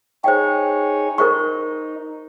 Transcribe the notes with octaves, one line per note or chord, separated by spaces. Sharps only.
D#4 G#4 C5 C#5 G5
D#4 A#4 C5 C#6